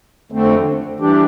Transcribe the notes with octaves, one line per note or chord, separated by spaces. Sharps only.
F2 D3 A3 C4
E3 G3 D4 G4